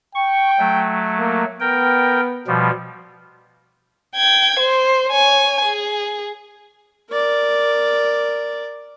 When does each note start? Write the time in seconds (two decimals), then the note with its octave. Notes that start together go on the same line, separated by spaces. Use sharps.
0.15 G5 C#6
0.59 F#3 A3
1.19 A#3
1.60 B3 A#4 G5
2.47 B2 F3 G3
4.16 G5 G#6
4.59 C5
5.11 C#5 G#5
5.65 G#4
7.10 A#4 D5